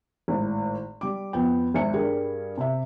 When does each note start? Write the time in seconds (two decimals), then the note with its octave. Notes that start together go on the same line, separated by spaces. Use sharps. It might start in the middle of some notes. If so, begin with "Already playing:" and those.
0.28 G#1 A2
1.01 G3 D6
1.33 F2 B3 G5
1.74 G#1 E5 G#5 C#7
1.94 G2 G3 G#4 A#4
2.58 C3 E5